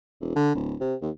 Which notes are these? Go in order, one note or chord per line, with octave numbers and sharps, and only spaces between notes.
E1
D3
D1
C3
D#2